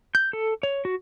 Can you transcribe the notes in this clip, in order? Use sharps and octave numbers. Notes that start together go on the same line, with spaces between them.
G6
A4
C#5
F#4